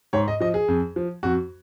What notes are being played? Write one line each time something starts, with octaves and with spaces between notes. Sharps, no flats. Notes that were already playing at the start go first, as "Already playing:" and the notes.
G#2 C#5
D#5
F3 D#5
G#4
F2
F3
F2 F#4